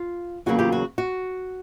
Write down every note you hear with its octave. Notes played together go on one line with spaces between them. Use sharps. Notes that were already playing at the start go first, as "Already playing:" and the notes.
Already playing: F4
E2 C#3 F#3 A#3 F#4
F4 G4
F#4
F#4